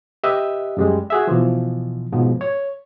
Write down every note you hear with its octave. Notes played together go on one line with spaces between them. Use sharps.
G4 B4 D#5 E5
F#2 G3 G#3
F#4 G#4 E5
B2 E3 F3
G#2 B2 F3
C#5